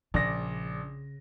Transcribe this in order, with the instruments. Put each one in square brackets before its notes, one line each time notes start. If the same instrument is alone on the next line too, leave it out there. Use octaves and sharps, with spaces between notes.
[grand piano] A#1 D5 A#6 [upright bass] C#3